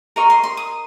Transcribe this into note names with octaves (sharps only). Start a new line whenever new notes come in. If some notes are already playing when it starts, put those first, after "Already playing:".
D#4 A#4 D#5 C#6
C6
C6
D#6